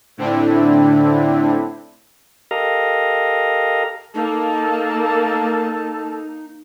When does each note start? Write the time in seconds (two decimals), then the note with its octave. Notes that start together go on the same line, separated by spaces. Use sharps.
0.17 A2 D3 C4 D4 E4
2.51 G4 A4 A#4 D#5 F5 A#5
4.15 A#3 D#4 A4 A5